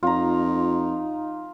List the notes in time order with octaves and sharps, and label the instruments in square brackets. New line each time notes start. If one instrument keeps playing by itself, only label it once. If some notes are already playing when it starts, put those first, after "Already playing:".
[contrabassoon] F2 [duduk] D#4 [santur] F4 A#5